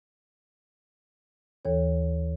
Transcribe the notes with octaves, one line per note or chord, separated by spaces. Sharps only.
D#2 E3 A4 C#5